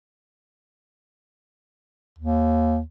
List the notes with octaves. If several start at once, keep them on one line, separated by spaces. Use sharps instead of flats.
D#2